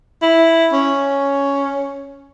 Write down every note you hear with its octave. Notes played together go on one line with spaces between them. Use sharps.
E4
C#4